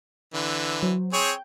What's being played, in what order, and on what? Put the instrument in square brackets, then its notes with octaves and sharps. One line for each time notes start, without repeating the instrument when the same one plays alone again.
[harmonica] D3 E3
[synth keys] F#3 C5
[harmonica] C4 G#4 C#5 [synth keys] G5 G6